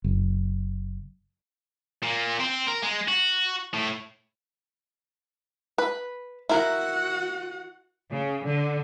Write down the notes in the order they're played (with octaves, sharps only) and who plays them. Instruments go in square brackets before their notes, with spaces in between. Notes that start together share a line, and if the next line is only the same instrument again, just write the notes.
[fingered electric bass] F#1
[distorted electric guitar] A#2 A#3
C4
A#4
G#3
F#4
A2
[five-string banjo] B4
[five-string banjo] E4 A#4 [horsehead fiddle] F#4 F#5
[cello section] C#3
D3